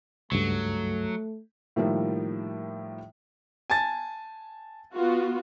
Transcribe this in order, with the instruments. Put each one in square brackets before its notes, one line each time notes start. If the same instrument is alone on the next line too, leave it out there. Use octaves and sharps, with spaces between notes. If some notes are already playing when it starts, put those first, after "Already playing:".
[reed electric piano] C#2 G2 [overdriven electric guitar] F#3 [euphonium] A3
[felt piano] A2 D#3 F3 G3 A#3 E4
[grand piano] G#5 A5 A6
[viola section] B3 F4 F#4